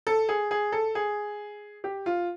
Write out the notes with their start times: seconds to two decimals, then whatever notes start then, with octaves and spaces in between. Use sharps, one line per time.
0.07 A4
0.29 G#4
0.51 G#4
0.72 A4
0.95 G#4
1.84 G4
2.06 F4